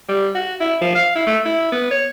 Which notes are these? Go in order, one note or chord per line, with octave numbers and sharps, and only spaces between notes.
G3
F#4
E4
F3
F5
E4
A3
E4
B3
C#5